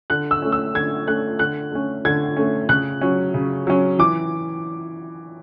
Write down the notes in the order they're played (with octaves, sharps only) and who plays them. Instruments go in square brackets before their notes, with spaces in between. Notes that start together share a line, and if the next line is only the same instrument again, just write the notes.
[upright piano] D3 F#6
E6
A3 C#4
E6
D3 G#6
A3 C#4 F#6
D3 F#6
A3 C#4
D3 G#6
A3 C#4
C#3 F#6
F#3 C#4
C#3
F#3 C#4
E3 D6